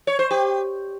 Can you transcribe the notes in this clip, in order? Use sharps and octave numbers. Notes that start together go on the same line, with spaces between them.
C#5
C5
G4